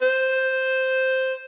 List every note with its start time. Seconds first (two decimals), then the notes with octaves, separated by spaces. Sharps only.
0.02 C5